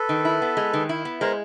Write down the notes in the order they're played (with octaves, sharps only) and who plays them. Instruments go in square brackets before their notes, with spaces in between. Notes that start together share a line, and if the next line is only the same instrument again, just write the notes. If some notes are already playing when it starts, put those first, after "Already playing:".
Already playing: [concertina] A4 B4
[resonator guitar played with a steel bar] D#3
E4
B3
G#3
D#3
E4
B3
[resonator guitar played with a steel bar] G#3 [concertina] A#4 C5